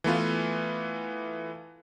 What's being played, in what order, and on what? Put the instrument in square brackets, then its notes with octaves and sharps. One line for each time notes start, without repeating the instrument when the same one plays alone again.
[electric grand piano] E3 A3 B3 F4